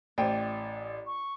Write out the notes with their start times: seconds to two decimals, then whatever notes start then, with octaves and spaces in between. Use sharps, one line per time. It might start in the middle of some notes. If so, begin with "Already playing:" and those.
0.18 A1 E4 C5 D5 G5
1.06 C#6